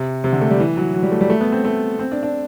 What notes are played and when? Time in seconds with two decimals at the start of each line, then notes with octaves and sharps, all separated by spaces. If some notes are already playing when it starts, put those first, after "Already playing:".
Already playing: C3
0.24 C3
0.32 D3
0.41 A3
0.50 G3
0.60 E3
0.77 F#3
0.94 F#3
1.03 G3
1.12 A3
1.21 G3
1.30 A3
1.41 B3
1.52 C4
1.65 A3
1.99 C4
2.12 D4
2.23 D4